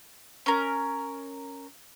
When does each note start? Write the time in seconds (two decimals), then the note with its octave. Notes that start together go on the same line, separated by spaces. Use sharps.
0.46 C#4 A#4